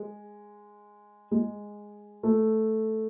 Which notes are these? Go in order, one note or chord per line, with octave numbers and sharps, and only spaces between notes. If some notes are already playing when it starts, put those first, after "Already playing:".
Already playing: G#3
G#3
A3